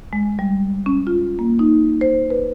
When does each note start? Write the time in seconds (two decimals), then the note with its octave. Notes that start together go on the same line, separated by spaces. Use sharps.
0.13 G#3
0.39 G3
0.86 C#4
1.07 F4
1.39 A#3
1.59 D#4
2.01 C5
2.30 B4